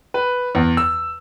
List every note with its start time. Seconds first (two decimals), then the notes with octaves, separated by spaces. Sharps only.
0.14 B4
0.55 E2
0.77 E6